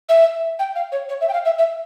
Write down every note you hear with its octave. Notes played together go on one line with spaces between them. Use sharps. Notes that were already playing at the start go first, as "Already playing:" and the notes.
E5
G5
F5
C#5
C#5
E5
G5
F5
E5
E5